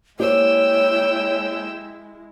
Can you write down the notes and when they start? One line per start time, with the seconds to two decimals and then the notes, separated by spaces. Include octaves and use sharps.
0.19 G#3 A#3 E4 G4 C5 C#5 G5 E6